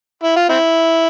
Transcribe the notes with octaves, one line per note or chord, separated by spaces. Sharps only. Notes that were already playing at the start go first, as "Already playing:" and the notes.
E4
F4
C4 E4